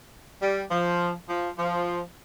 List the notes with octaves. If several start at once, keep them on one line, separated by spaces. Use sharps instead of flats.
G3
F3
F3
F3